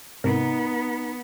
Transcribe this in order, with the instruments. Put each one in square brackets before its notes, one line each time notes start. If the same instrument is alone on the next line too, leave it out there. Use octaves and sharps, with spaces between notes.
[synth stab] G#2 C3 A#4 [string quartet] B3 [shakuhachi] D#4